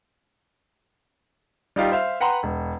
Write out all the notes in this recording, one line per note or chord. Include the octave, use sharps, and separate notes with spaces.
G3 D#4 F4 G4
C5 E5 F5
B4 F#5 G5 A#5 C6
E1